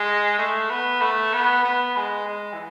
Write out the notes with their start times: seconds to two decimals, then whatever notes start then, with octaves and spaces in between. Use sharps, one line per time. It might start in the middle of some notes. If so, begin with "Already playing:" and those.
Already playing: G#3
0.38 A3
0.70 B3
1.01 A3
1.34 B3
1.64 B3
1.96 G#3
2.27 G#3
2.53 E3